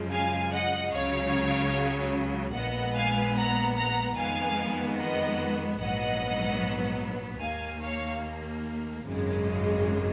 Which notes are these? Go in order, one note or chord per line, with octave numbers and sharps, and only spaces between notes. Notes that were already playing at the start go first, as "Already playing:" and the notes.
Already playing: F#2 C#3 F3 G#3
F5 G#5
D#5 F#5
C#2 C#3 F#3 C#5 F5
A#1 A#2 G#3 B3 D#5 F#5
F5 G#5
F#5 A#5
F#5 A#5
F2 D#3 G#3 B3 F5 G#5
D#5 F#5
A#1 G#2 F#3 B3 D#5 F#5
D#2 D#3 A#3 F5 G#5
C#5 F5
G#1 F#2 C#3 G#3